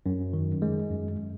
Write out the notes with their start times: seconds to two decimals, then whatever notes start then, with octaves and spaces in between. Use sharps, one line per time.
0.06 F#2
0.33 D#3
0.62 G#3
0.91 F#2